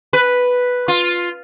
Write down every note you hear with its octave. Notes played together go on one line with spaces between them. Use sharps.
B4
F4